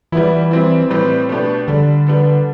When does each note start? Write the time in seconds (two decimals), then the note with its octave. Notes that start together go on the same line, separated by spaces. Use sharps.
0.12 E3 G3 B3 E4
0.51 G3 C4 E4
0.90 A2 G3 C4 G4 B4
1.29 B2 A3 D4 G4 B4
1.68 D3 G3 D4 A4
2.07 G3 B3 D4 A4